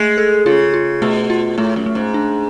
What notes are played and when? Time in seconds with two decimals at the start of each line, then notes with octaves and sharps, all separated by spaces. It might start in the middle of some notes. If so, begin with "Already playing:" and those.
Already playing: G#3 A3
0.18 A4
0.46 C#3 F4
0.74 F4
1.02 B2 A3
1.30 F4
1.58 A2 A3
1.76 F#2
1.86 A3
1.95 G#2
2.14 D4